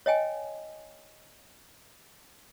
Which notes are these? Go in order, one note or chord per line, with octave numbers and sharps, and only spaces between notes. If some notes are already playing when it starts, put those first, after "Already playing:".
C#5 D#5 G5 G#5